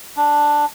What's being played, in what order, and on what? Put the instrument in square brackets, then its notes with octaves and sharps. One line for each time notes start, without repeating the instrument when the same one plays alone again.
[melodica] D4